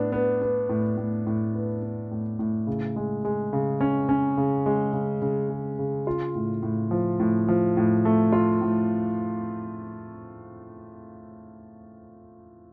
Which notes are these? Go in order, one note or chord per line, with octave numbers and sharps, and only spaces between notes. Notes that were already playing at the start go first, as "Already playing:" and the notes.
Already playing: A2 B3 D4
B3
B3
A2
A2
A2
B3
B3
A2
A2
C#3
G#3
G#3
C#3
C#4
C#4
C#3
G#3
C#3
C#3
G#3
C#3
F4
A2
A2
F3
A2
F3
A2
A3
F4
A2